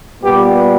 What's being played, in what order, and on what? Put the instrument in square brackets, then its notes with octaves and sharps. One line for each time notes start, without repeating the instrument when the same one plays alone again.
[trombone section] A#2 G3 B3 G4